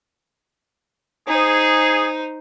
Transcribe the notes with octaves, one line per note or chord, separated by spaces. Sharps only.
D#4 G#4 C5